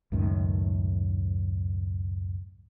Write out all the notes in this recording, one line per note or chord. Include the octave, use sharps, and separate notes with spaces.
C#2 F#2 A2 D#3